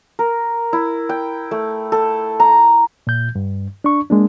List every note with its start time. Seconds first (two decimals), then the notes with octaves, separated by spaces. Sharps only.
0.19 A#4
0.73 E4
1.09 G5
1.51 A3
1.92 A4
2.40 A#5
3.07 A#2 G6
3.35 G2
3.84 D4 C#6
4.10 G#3 A#3 D4